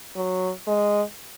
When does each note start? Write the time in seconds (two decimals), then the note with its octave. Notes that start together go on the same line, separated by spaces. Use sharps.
0.17 F#3
0.67 G#3